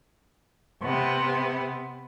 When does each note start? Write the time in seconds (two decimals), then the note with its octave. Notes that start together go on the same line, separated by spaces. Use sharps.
0.82 C3 B3